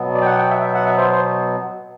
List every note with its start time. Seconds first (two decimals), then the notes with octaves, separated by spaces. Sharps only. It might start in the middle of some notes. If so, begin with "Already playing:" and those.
Already playing: B2 F#3 B3
0.14 D5
0.22 G5
0.25 F#5
0.38 G5
0.50 E5
0.61 E5
0.74 F#5
0.85 E5
0.97 C5
1.09 C5